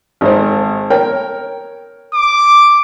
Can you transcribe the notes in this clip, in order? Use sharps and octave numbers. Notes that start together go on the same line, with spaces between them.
G#1 D#4 C5
A#4 C#5 G5
D6